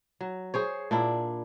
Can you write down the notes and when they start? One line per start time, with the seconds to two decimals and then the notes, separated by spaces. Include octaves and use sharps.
0.21 F#3
0.54 G#4 C5 C#5
0.91 A#2 D4 E4